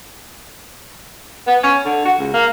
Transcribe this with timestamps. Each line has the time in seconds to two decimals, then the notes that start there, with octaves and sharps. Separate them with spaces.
1.47 B3
1.63 C#4
1.86 D3
2.05 F#4
2.19 C#2
2.34 A#3